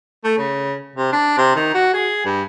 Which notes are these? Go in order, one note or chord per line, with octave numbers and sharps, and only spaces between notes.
A3
C#3
C3
D4
C3
D#3
F#4
G#4
G2